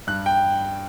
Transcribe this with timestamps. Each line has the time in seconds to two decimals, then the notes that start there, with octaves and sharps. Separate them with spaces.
0.07 G2 F#6
0.26 G5